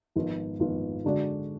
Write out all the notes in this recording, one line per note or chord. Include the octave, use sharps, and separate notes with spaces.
G#1 G#2 F3 B3 F4
G#1 G#2 F3 B3 F4
D3 G#3 D4 F#4 D5